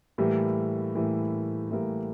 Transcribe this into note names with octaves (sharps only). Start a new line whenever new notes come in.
A2 E3 G3 A#3
A2 E3 G3 A#3
A2 E3 G3 A#3